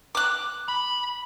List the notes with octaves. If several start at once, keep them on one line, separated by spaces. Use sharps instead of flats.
D6 F#6
B5